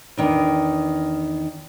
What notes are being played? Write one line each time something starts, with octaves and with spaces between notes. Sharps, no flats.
E2 D#3 D4